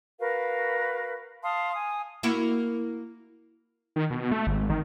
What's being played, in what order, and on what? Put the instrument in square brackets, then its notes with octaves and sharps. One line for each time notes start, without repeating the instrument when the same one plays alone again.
[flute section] F#4 A#4 B4 F5
F5 A5 C6 D#6
G#5 D#6
[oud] A#3 E4 F#4
[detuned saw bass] D#3
B2
A3
G#1
D#3